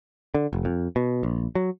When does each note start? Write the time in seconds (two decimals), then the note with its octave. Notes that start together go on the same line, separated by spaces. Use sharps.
0.35 D3
0.53 F1
0.65 F2
0.96 B2
1.23 A#1
1.55 F#3